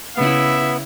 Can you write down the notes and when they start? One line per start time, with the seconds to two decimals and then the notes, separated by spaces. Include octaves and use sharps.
0.17 C#3 B3 E4 E5